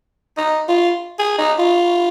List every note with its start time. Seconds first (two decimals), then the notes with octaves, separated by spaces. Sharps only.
0.37 D#4
0.68 F4
1.19 G#4
1.38 D#4
1.59 F4